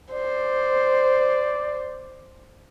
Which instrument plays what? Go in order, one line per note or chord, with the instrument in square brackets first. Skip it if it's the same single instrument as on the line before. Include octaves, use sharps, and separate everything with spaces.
[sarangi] C5 [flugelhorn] D5